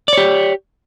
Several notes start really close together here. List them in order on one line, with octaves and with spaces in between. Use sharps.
D5 C#5 G4